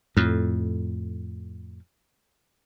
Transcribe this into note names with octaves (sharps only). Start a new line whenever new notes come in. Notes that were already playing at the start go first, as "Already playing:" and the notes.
F2 A2